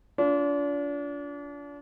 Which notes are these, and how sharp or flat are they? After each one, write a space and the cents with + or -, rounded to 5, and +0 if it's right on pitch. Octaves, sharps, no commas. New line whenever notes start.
D4 -35 F4 +0